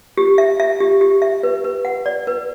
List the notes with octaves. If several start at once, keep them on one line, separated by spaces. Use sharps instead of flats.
G4
E5
E5
G4
G4
E5
B4
B4
F#5
D5
B4